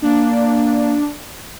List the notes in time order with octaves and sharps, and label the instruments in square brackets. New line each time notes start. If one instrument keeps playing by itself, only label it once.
[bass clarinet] A#3 [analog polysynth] D4